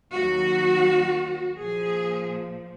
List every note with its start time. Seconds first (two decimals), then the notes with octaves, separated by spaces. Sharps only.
0.13 D#2 D#3 F#3 F#4
1.58 A#2 F3 G#4